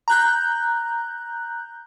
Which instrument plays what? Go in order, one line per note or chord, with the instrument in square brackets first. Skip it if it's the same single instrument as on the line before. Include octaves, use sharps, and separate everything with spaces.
[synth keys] A#5 F#6 G6